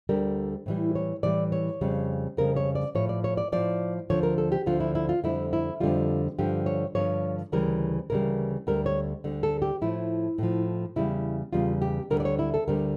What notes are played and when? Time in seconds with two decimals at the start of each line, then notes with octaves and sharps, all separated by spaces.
0.09 D2 D3 G3 A#4
0.66 A2 E3 G3
0.95 C#5
1.23 A2 E3 G3 D5
1.52 C#5
1.81 F2 C#3 G3
2.37 F2 C#3 G3 A#4
2.56 C#5
2.75 D5
2.95 A2 F3 C#5
3.09 D5
3.24 C#5
3.37 D5
3.52 A2 F3 D5
4.10 D2 D3 F3 C#5
4.23 A#4
4.38 A4
4.52 G4
4.66 D2 D3 F3 F4
4.80 E4
4.95 E4
5.09 F4
5.24 F2 D3 G3 E4
5.53 E4
5.80 F2 D3 G3 F4
6.38 G2 D3 F3 G4
6.66 C#5
6.95 G2 D3 F3 C#5
7.52 D2 C#3 E3 G3 A#4
8.10 D2 C#3 E3 G3 A#4
8.67 D2 D3 G3 A#4
8.86 C#5
9.24 D2 D3 G3
9.43 A4
9.62 G4
9.81 A2 F3 E4
10.38 A2 F3
10.96 E2 C#3 G3 E4
11.53 E2 C#3 G3 F4
11.82 G4
12.10 D2 D3 G3 A#4
12.20 D5
12.25 C#5
12.39 E4
12.54 A4
12.68 D2 D3 G3 A#4